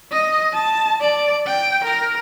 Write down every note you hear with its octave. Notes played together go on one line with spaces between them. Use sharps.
D#5
A5
D5
G5
A#4